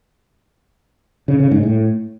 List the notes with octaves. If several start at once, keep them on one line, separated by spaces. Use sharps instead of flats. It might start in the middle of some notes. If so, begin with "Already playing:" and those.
C#3
C#3
G#2
A2